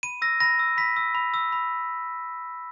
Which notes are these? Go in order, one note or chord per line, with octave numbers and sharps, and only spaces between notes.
B5 D#7
E6 A#6
B5 A#6
E6
B5 B6
E6
B5
E6
B5